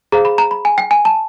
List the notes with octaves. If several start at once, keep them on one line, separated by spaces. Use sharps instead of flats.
G#4 C5 F5 A#5
B5
A#5
B5
G#5
G5
G#5
A5